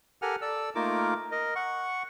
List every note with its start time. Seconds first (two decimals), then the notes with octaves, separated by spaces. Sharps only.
0.22 G4 A4 A#4 F#5 G#5 F6
0.42 A4 D5 E6
0.75 A3 A#3 D#4 F4 A#4 D6
1.31 A#4 D#5
1.56 F#5 C#6